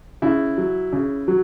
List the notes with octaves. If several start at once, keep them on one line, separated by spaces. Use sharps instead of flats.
C#3 E4
F#3
C#3
F#3